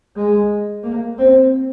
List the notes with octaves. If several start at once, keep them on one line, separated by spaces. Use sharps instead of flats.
G#3
A#3
C4